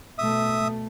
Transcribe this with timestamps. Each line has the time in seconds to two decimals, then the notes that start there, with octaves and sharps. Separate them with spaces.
0.18 B2 A3 E5 D#6